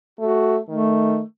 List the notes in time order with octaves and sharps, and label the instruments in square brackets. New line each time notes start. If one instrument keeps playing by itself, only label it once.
[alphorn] A3 [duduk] F#4
[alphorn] D#3 [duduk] A3